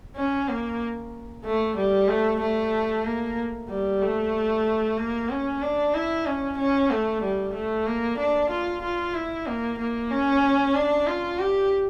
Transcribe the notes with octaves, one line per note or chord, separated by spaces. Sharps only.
C#4
A#3
A3
G3
A3
A3
A#3
G3
A3
A#3
C#4
D4
E4
C#4
C#4
A3
G3
A3
A#3
D4
F4
F4
E4
A#3
A#3
C#4
D4
F4
G4